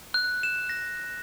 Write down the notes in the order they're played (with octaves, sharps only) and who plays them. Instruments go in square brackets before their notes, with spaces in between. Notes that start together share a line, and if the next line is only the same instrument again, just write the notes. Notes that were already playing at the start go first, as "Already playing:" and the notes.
[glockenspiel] F#6
E7
A#6